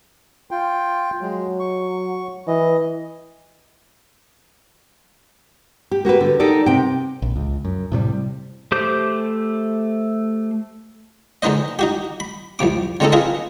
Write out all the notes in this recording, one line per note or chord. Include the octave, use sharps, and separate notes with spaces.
F4 G5
F#3 G#3
C#6
E3 D#5
G4
A#3 F#4 G4 B4
D3
D#4 G4 A4 A#4 D5
C3 G5
A#1
C#2
F#2
A2 C3 F#3 G3
A3 G4 C5 D6 G6
D3 G#3 D#4 B4 C5 D#5
D#4 F#4 G4
B5
C2 F2 C3 D6
D3 G#3 C4 C#4 D#4 A4
F4 G#4 B4 D#5